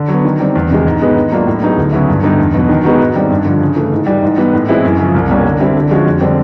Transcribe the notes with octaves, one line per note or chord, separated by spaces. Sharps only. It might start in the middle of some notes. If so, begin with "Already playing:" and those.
Already playing: D3
F#3 B3
D#3
G3 C4
E2
C3 D#3 G#3
G#2
D#3 G#3 B3 D#4
D#3
F#3 A#3 D4 F4
A2
F#3 B3 D#4 G#4
D2
C#3 F#3 B3 E4
G2
D3 G3 B3 D#4
E2
B2 F#3 B3
D#3
G#3 B3 D#4 F#4
G#2
D#3 G3 C4
G2
D3 F3
C#3
E3 A3
G#2
E3 G3
G#2
E3 G3 B3
A2
E3 G#3 C4 E4
F#2
C#3 F3
C2
B2 G3 A#3 C#4
D3
G3 C4 E4 G4
D3
F3 G#3 C#4 F#4
F2
D3 G3 C4